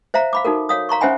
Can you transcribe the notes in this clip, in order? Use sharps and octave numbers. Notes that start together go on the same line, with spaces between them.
C5 E5 F5 A#5
F5 B5 D6
D#4 F#4 A4 A#4
C#5 F5 D#6
F5 A#5 C6 C#6
C#4 C5 E5 F#5 G#5 B5